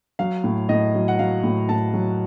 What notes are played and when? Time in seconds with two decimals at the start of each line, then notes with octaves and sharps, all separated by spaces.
0.19 F#3 F5
0.44 A2
0.69 A2 D#5
0.94 F#3
1.08 F#5
1.19 F#3 F5
1.43 A2
1.69 A2 A5
1.94 F#3